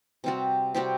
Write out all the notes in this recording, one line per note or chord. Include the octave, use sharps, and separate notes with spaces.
C3 G3 C4 F#4
C3 G3 C4 F#4